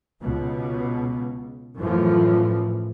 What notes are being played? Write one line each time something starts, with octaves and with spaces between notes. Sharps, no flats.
C#2 B2
F#2 A2 E3 F3